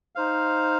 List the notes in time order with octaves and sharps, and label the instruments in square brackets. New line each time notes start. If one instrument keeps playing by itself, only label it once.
[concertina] D#4 C5 F5